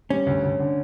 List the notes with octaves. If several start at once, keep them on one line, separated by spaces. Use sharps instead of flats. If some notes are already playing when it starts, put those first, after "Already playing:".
G3 C#4
D2
D2
D3